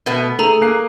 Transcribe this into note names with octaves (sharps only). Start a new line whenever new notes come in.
B2 A3 B3
A3 G#4 A4 A#5
A#3 F#6 C7